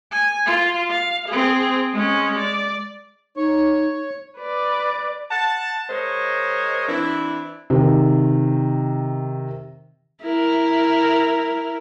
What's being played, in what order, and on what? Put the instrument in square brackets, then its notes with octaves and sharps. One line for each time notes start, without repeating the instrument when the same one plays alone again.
[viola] G#5
F4
F5
C4 G#4
G#3 C#4
D5
[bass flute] D#4 [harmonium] C#5
[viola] B4 D5
[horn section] F#5 A5
G#3 A#4 C5 C#5 D#5
E3 C4 D4 E4
[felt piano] C3 D#3
[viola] E4 A#4